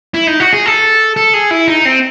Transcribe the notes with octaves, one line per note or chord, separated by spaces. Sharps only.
E4
D#4
F#4
G#4
A4
A4
G#4
E4
D#4
C4